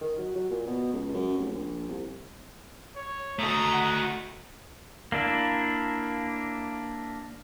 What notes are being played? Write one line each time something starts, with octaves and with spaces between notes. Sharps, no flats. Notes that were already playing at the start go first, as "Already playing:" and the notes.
D#3
F#3
F#3
A#2
B2
C#2
F#2
F1
A#1
C2
C#5
A3 F#4 A4 D#5 A#5
F#5
A#3 D4 E4